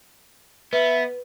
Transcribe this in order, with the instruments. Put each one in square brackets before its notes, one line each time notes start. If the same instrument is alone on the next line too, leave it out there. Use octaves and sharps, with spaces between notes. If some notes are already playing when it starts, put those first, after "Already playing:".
[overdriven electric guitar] B3 [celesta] B4 [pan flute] E5